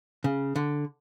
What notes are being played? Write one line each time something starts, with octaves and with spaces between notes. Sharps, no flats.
C#3
D3